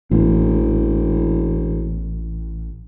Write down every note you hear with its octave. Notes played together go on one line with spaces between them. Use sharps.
E1 A1